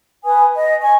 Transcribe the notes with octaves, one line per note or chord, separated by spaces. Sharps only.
B4 G#5 D#6
D#5
G#5 C#6